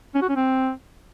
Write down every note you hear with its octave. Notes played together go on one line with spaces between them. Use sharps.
C#4
F#4
C#4
C4